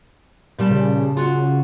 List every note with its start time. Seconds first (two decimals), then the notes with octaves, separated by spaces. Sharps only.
0.58 A#2 G3 A5
0.71 C#3
1.17 F4 F#4